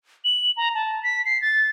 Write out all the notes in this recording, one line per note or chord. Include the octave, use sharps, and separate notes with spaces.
F#7
A#5
A5
B6
C7
A6